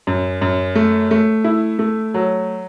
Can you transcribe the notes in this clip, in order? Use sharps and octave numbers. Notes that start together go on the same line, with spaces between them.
F#2
F#2
A3
A3
E4
A3
F#3